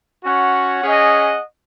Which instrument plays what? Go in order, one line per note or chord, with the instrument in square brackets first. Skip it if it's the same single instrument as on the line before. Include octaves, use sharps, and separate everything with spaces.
[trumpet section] C#4 F#4 C#5 F#5
C#4 G#4 D#5 F#5